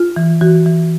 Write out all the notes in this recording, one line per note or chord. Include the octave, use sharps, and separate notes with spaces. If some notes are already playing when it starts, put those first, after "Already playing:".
Already playing: F4
E3
E3 F#4
E3